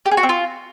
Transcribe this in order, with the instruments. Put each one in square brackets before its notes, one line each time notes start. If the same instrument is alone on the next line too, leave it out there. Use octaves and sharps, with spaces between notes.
[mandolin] G4
G#4
F#4
C4
F4